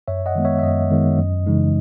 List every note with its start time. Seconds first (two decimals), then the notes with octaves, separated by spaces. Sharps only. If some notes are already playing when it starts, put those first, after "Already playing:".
0.08 F#2 C#5 E5
0.26 D#5 F#5
0.35 D#3 G#3 B3
0.45 C#5 E5
0.59 E5
0.63 F#2 D#5
0.91 D#3 G#3 B3
1.19 F#2
1.46 C#3 E3 G#3 D#4